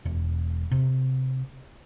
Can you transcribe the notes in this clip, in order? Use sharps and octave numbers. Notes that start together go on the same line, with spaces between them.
E1
C3